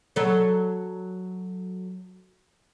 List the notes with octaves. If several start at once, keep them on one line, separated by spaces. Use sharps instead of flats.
F#3 A4 C#5